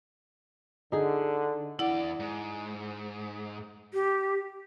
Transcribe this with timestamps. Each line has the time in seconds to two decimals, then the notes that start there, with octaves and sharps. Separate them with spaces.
0.92 D3 D#4 G#4
1.79 E2 E4 D5 F#5
2.20 G#2
3.94 G4